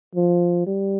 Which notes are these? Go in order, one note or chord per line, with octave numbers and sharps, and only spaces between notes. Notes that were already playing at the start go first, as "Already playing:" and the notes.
F3
G3